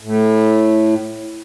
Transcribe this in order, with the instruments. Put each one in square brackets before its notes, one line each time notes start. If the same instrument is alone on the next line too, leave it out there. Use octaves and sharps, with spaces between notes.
[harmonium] A2